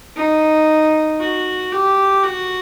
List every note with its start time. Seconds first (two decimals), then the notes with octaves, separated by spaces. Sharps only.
0.16 D#4
1.20 F#4
1.71 G4
2.23 F#4